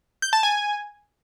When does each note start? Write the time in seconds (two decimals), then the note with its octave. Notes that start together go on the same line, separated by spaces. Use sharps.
0.22 G6
0.33 A5
0.43 G#5